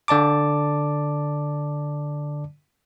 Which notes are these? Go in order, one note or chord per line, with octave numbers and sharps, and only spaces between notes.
D3 D5 A5 D6